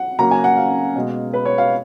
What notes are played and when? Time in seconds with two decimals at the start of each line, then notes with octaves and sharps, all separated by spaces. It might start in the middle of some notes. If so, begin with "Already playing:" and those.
Already playing: F#5
0.19 C#3 F#3 A#3 A#5
0.31 G#5
0.44 F#5
0.57 F5
0.96 B2 G#3
1.34 B4
1.45 C#5
1.58 F5